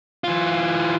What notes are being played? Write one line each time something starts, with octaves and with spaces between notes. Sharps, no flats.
E3 F4